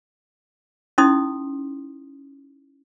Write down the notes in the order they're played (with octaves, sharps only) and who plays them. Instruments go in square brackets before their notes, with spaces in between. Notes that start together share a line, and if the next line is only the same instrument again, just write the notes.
[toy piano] C#4 D#4 E4 C6 D#6